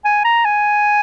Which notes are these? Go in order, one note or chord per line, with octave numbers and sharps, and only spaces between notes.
G#5
A#5
G#5